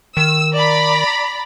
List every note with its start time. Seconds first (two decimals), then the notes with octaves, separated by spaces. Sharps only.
0.17 D#3 E6
0.54 D5 A#5 B5